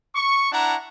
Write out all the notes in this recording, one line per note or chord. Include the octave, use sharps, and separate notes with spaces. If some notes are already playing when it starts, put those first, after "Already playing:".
C#6
D4 E4 F#5 A5 A#5